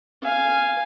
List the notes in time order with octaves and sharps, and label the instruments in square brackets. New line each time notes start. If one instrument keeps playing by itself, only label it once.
[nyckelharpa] F5 G#5